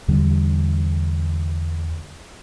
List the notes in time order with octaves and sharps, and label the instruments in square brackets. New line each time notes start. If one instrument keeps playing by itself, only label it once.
[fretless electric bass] E2 D3 G3